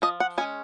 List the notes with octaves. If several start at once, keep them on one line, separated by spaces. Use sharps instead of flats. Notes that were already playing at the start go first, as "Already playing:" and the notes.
F3 D#5
F#5
G#3 C#4 G#5